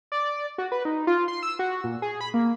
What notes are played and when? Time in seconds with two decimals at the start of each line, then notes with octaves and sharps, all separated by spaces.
0.12 D5
0.58 F#4
0.72 B4
0.85 D#4
1.07 F4
1.28 C6
1.43 E6
1.59 F#4
1.84 A#2
2.02 G#4
2.21 B5
2.34 A#3